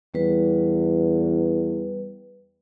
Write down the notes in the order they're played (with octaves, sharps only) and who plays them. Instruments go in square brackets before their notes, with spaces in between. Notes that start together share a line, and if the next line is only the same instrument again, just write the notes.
[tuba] E2 [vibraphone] G3 B4